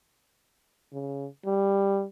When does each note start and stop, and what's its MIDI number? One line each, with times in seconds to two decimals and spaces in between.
0.93 1.26 49
1.46 2.04 55